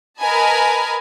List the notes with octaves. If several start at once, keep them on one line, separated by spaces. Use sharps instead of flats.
A#4 B4 D#5 G#5 A5 B5